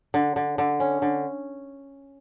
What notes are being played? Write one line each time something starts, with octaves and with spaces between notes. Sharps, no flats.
D3
D3
D3
C#4
D3